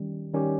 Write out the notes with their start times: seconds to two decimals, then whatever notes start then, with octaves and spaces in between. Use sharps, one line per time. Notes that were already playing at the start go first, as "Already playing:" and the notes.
Already playing: D#3 G3 C#4 G4
0.33 D#3 G3 C#4 G4